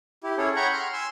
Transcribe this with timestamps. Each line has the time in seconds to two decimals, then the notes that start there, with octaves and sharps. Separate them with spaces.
0.24 E4 G4
0.37 C#4 E4 G#4 A4 C#5
0.56 C#5 F#5 G5 A#5 B5 C#6
0.73 C6 F6
0.93 G#5 C6 E6